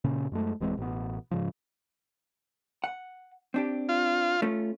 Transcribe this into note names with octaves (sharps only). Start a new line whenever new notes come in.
A#2 C#3 C#4
F#2 G#3 A3
D1 E3 G#3 C4
A1 B2 B3
G#2 C#3 F3
F#5
C4 D4 G4
F4
A3 C#4 F4